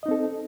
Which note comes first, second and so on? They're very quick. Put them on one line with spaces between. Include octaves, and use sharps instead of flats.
D#5 D#4 C4 A4